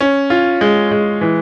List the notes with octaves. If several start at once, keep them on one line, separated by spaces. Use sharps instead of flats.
C#4
F4
G#3
G#3
E3